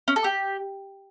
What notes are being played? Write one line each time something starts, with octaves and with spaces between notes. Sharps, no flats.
C#4
A4
G4